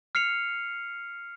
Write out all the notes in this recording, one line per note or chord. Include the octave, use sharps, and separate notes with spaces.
F6 C7 C#7 F7